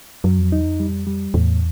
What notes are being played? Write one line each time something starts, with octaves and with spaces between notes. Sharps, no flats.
F#2 F#3
F2
E2 D#4
F2
G3
G3
E2 A2